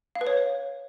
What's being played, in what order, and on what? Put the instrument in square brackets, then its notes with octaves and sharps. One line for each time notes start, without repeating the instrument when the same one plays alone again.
[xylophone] F5
B4
C#5